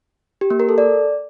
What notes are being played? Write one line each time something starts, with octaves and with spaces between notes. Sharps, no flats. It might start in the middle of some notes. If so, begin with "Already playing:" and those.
G4
A#3
A#4
A4
D5